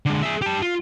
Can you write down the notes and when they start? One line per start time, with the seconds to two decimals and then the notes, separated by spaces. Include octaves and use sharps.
0.06 D3 G#3
0.23 G#4 E5
0.42 G4 A5
0.62 F4